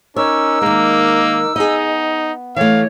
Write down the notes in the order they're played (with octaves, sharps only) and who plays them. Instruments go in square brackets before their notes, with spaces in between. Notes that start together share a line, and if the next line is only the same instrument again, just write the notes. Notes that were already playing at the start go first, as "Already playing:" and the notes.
[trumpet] C#4 [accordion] D#4 A#4 D6 [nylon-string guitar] C#5 [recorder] E6
[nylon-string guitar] D#3 G#3 [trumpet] A#3
[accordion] B3 [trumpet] D#4 [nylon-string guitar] G#4 D#5
[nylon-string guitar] E3 A3 [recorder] C#5 [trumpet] F5